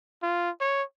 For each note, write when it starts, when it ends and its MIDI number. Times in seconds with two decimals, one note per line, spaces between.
0.23 0.50 65
0.60 0.83 73